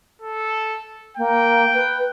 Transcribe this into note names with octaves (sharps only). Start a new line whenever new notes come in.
A4
A#3 G5
B4